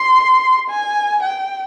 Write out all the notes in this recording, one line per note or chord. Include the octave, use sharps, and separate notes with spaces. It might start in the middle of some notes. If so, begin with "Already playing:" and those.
Already playing: C6
G#5
G5